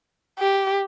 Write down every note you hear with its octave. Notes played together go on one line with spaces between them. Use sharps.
G4